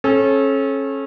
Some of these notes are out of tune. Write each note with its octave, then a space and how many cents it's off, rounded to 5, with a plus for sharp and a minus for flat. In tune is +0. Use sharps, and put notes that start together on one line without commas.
C#4 -30 A4 -30